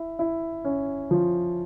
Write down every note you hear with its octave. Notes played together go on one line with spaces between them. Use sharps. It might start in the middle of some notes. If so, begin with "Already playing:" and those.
Already playing: E4
E4
C#4
F3